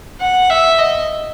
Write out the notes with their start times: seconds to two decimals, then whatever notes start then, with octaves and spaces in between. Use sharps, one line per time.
0.20 F#5
0.50 E5
0.79 D#5